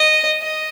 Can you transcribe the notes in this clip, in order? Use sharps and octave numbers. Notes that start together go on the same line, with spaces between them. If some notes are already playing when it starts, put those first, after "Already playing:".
Already playing: D#5
D#5